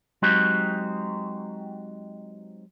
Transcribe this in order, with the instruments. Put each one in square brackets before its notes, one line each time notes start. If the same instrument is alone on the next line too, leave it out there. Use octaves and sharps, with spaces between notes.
[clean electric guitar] F#3 G#3 C4 D#4 F#4 G4